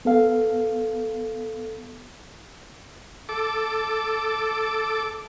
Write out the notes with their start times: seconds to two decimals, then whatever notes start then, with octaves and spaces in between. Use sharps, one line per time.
0.05 B3 A4 F5
3.29 A4 D6